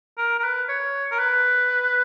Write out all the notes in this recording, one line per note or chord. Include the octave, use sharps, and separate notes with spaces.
A#4
A#4
B4
C#5
A#4
B4